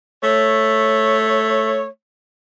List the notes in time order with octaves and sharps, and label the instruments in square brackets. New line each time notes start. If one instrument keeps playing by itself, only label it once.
[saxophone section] A3 C#5